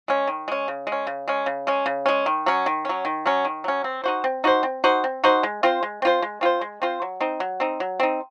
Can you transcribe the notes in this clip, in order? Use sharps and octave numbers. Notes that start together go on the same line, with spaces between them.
G#3 C#4
D#3
G#3 C#4
C#3
G#3
C#4
C#3
G#3 C#4
C#3
G#3 C#4
C#3
G#3 C#4
D#3
F#3 C#4
D#3
F#3 C#4
D#3
F#3 C#4
D#3
F#3 C#4
C4
D#4 F#4 C5
C4
D#4 F#4 C5
C4
D#4 F#4 C5
C4
D#4 F#4 C5
G#3
C4 F4 C5
G#3
C4 F4 C5
G#3
C4 F4 C5
G#3
C4 F4 C5
F#3
C4 D#4
F#3
C4 D#4
F#3
C4 D#4